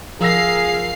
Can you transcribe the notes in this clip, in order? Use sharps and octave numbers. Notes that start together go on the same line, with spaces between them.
F3 G#4 A#4 F5 E6 A#6 C7